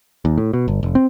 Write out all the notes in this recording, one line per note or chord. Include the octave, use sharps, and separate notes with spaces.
D#2
A2
B2
G1
F1
C4